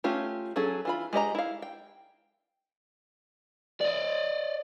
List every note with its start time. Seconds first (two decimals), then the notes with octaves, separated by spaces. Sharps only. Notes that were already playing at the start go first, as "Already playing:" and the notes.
0.04 A3 C#4 F4 G4
0.56 F#3 C#4 G#4 A4
0.85 E3 F4 B5
1.13 G#3 G4 D#5 A#5
1.35 E4 F5
1.62 G5
3.81 D5 D#5